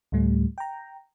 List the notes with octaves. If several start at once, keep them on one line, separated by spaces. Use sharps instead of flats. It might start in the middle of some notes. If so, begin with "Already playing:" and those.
D2 A2 G3 A3
G5 A#5